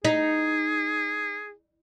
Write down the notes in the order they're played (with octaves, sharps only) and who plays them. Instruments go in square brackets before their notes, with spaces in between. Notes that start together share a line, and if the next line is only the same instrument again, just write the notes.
[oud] D#4 [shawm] G#4